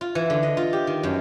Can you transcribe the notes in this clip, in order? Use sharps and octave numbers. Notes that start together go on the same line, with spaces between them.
F4
E3
D3
D#5
F4
G4
D#3
F#2